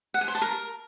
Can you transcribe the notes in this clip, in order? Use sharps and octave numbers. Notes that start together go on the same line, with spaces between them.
F#5
G#5
C5
A5
A#4